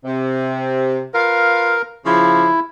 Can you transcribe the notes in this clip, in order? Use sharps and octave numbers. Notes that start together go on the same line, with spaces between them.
C3
F4 A#4 B4 F5
C#3 F3 E4